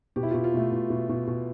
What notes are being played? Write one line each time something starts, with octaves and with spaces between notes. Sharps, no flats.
B2 G4
E4
B2 F4
F4
B2 A3
B2
B2
B2
B2